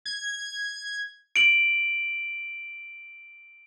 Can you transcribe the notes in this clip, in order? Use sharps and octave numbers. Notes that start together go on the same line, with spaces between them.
G#6
D7 F#7